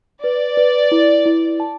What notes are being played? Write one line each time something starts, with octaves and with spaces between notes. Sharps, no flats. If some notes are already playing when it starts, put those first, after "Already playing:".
B4 D5
B4
E4
E4
A5